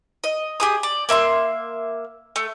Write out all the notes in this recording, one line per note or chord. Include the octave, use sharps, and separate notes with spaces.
D#5
G4 G#4 D#6
D5
A#3 E5 B5 C6
A3